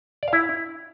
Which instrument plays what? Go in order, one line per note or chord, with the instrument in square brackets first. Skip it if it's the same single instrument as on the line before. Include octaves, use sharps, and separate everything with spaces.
[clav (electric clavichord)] D5
F5
E4